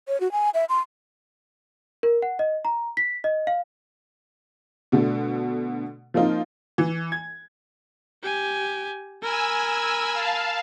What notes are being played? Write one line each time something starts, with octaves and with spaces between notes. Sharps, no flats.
C#5
F#4
G#5
E5
C6
A#4
F#5
D#5
A#5
B6
D#5
F5
B2 D3 A3
F3 A#3 C4 D#4 F4
E3
G#6
G4 G#5
A#4 G#5 B5 E6
F5 A5